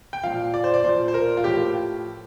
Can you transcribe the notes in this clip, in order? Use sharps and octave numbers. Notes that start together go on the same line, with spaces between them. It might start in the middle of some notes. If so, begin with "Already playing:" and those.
G5
A#2 F3 F5
D5
C5
D5
A#2 F3 C5
C5
A#4
F4
A2 F3 G4